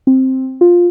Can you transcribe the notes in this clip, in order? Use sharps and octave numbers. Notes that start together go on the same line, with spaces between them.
C4
F4